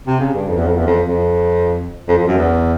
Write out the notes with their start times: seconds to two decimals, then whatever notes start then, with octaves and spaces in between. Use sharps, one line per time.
0.07 C3
0.20 C#3
0.34 G2
0.47 F2
0.57 E2
0.67 F2
0.77 E2
0.87 F2
1.08 F2
2.08 F2
2.18 F2
2.27 F#2
2.38 E2